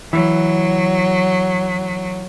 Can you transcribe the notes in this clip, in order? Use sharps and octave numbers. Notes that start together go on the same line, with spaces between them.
E3 F#3